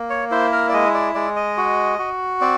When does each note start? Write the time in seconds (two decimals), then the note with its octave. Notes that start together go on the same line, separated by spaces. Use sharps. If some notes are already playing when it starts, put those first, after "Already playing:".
Already playing: A#3
0.10 C#5
0.31 E4 C5
0.52 A#4
0.69 D5
0.73 G#3 D#5
0.94 D5
1.15 G#3 D5
1.36 D#5
1.57 F#4
1.98 F#4
2.41 C4 D5